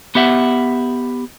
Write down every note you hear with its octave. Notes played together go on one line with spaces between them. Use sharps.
B3 G4 E5 F#5